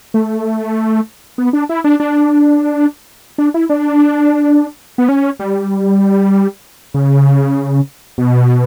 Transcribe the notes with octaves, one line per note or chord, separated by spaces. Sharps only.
A3
B3
D4
E4
D4
D4
D4
E4
D4
B3
C#4
G3
C#3
B2